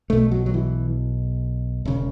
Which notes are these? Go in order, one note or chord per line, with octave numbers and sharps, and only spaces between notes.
B1 B2 A3
F#3
F#3
E3
E1 C#3